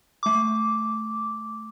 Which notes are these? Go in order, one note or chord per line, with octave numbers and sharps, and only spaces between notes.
A3 D6